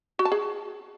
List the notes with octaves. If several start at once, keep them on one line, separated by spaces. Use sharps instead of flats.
F#4
A5
G#4